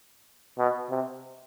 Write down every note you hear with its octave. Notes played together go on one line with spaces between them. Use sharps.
B2
C3